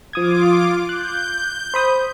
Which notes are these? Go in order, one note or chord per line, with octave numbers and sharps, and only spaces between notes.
F3 F4 D6 D#6 G#6
F#6 G6
C5 B5 D#6